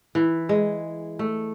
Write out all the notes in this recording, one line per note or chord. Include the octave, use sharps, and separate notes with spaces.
E3
G#3
A3